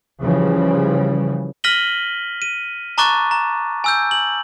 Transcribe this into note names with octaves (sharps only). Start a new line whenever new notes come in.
C#3 E3 F3 G3
F6 A#6 B6 D#7 F#7 G7
D#7
A5 A#5 C#6 D6 F#6 A6
A#5
G#5 E6 G6
F#7